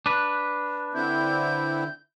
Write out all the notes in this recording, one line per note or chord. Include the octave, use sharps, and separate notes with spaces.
D4 B4
D3 C4 E4 G6